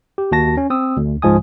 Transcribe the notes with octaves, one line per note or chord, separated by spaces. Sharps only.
G4
D#2 F#4 A5 A#6
C#4
C4 D#6 E6
D2
C#2 G#2 F3 G#3 G#5 D#6